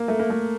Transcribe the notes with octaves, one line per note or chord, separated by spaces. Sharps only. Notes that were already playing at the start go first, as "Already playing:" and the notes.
Already playing: A#3
A3
A#3
A3